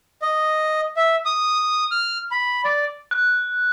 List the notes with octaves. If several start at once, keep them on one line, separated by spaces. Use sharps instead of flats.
D#5
E5
D#6
F6
B5
D5
F#6